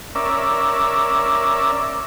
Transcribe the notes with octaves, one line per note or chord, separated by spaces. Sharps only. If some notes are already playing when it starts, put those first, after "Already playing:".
C#4 A#4 D5 E5